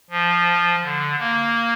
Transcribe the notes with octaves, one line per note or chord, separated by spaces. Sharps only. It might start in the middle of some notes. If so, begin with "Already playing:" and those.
F3
D3
A#3